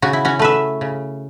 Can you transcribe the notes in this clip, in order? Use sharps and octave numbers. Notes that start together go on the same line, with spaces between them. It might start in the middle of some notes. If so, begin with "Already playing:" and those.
C#3 F#4
E4
C#4 F#4
A3 B4 E5
C#3